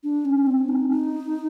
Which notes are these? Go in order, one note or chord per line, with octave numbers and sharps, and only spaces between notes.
D4
C#4
C4
D#4
D#4